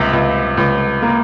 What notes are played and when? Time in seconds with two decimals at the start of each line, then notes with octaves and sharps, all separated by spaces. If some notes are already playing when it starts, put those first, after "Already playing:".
Already playing: C#2 C3
0.13 C#2
0.57 C#2
1.02 A#3